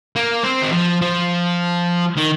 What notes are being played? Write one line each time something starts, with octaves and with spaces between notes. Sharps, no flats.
A#3
C4
D#3
F3
F3
D#3